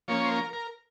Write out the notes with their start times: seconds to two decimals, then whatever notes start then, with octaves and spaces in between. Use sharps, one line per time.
0.08 F3 A#3 C#4 C#5
0.25 C5
0.31 A#4
0.53 A#4